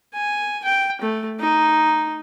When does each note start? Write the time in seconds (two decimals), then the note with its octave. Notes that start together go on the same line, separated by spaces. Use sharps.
0.14 G#5
0.64 G5
1.01 A3
1.40 D#4